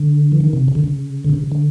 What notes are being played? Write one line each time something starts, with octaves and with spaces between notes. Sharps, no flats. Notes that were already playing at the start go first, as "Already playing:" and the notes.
Already playing: D3
E3
D#3
C3
C#3
D3
C#3
D3
C3
C#3
D3